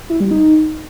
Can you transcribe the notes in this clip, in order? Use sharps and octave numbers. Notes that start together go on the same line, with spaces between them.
E4
G3
D#4